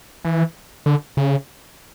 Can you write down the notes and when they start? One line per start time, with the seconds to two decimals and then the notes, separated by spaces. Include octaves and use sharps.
0.25 E3
0.86 D3
1.17 C#3